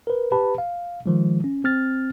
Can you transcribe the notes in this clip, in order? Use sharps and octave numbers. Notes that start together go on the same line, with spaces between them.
A#4 B4
G4 B4 A5 B5
F5
D#3 F3 G#3
C#4
C4 F6 A6